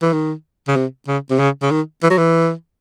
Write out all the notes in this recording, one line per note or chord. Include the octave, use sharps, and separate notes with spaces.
E3
D#3
C#3
C3
C#3
C3
C#3
C#3
D#3
E3
F#3
E3